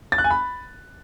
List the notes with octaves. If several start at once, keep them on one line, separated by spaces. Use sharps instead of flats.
A6
F#6
G#5
B5